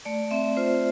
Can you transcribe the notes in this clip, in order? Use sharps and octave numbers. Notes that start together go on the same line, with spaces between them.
A3 D5
C4 E5
F4 C5